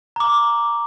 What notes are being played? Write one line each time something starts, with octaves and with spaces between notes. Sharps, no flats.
A#5 D6